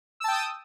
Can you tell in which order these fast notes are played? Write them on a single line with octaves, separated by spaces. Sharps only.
E6 A5 G5 D#6